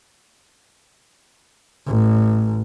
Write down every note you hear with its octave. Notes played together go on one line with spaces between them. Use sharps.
A1